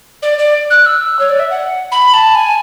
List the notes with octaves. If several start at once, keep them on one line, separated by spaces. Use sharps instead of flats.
D5
D5
F#6
E6
C#5
D5
E5
F#5
B5
A5
G#5